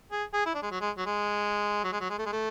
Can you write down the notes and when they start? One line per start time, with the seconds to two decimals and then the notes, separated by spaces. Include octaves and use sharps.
0.11 G#4
0.34 G#4
0.46 E4
0.55 D4
0.62 G#3
0.71 F#3
0.81 G#3
0.98 F#3
1.06 G#3
1.84 F#3
1.93 G#3
2.01 F#3
2.09 G#3
2.18 A3
2.26 G#3
2.33 A3